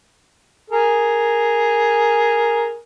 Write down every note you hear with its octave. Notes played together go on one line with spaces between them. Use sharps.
G#4 A#4